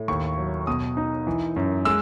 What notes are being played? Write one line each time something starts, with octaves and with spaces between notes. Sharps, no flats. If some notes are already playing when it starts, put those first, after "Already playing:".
Already playing: A2
D#2 C#6
F#3
B2 D#6
D#4
E3
F#2
G#3 E6